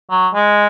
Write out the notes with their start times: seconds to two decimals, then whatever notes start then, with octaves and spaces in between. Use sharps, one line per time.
0.11 F#3
0.34 G#3